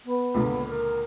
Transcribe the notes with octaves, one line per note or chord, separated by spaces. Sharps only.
B3
C#2 A#2 D3
A#4